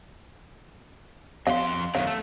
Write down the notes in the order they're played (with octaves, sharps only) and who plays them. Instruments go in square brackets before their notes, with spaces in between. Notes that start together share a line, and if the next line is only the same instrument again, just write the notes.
[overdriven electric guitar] F2 C6 [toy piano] F5
[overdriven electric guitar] F#2 D#3 [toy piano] F5
[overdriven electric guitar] A3